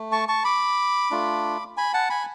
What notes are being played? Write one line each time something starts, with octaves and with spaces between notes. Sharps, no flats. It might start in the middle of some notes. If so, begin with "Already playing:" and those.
Already playing: A3
A5 C#6
A5 C#6
B5 D6
A3 D4 F4
G#5 B5
F#5 A5
G#5 B5